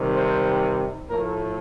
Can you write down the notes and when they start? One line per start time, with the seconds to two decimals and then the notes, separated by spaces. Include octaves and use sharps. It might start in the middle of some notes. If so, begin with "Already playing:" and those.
Already playing: C3 D#3 G3
0.14 C5
1.09 A2 F3 A3 A#4